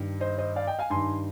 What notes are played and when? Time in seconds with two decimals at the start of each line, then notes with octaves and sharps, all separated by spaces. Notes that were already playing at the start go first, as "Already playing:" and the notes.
Already playing: G2 D#3
0.20 C5 D#5
0.38 C5 D#5
0.56 D5 F5
0.67 D#5 G5
0.79 F5 G#5
0.90 G2 D#3 G#5 C6